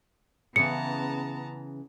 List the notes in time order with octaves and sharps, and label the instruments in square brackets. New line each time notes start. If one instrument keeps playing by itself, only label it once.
[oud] C#3 E3 [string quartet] B3 A5 A#5 [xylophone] C#7